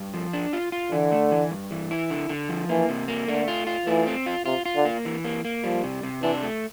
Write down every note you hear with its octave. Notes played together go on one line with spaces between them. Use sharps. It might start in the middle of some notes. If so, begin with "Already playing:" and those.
Already playing: G2
F3
D4
F4
F4
D3 E3
A3
E3
G2
E3
E4
D3
D3
F3
E3 A#3
C3
A#3
D3 A3
F4
F4
E3 A3
C4
F4
C3 F4
F4
D3
A#3
E3
A#3
A#3
F3 G3
C3
C3
E3 D4
A3